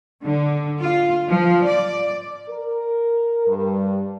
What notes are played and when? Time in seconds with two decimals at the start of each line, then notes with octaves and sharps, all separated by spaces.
0.22 D3
0.81 F4
1.28 F3
1.64 D5
2.49 A#4
3.46 G2